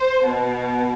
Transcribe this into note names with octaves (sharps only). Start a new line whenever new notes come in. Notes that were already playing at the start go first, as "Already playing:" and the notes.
Already playing: C5
B2